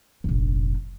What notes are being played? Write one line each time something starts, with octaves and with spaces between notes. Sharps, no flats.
F1 A#1